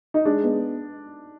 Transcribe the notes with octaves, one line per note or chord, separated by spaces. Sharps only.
D#4
G#3 D4
B3